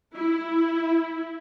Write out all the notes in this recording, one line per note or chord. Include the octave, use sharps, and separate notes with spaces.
E4